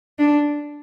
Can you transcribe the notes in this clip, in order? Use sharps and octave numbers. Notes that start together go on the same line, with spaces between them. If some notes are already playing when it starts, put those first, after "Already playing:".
D4